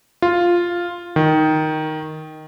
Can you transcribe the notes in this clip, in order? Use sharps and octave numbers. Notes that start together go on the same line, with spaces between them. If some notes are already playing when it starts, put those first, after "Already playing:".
F4
D#3